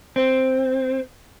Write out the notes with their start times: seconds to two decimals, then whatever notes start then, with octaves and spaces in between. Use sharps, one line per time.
0.16 C4